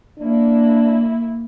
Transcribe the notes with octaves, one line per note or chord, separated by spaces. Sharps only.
A#3 D4 E4